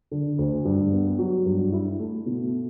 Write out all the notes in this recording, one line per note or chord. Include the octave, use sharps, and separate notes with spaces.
D3
D2
G2
B3
F#3
G2
E4
A3
B2